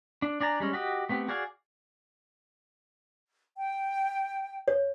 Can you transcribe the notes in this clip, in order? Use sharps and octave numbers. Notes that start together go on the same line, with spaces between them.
D4
D4 D5 G#5 A#5
G3 G#3 C#4
F#4 G4 D#5
A3 B3 C4 G4
F#4 G#4 D5 F5 G#5
G5
C#5